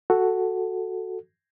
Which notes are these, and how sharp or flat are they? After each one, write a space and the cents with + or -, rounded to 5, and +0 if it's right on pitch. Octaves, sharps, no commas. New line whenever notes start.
F#4 +0 A4 +0